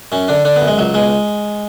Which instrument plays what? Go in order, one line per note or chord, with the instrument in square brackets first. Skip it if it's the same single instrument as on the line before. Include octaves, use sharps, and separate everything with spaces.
[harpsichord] F#2 C#4
D3 D4
D3 D4
B3
F#2
G#3
C#2 F#3
B2 G#3